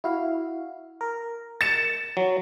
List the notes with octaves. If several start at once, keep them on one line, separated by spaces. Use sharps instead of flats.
E4 F#4 F5
A#4
A6 C#7 E7
F#3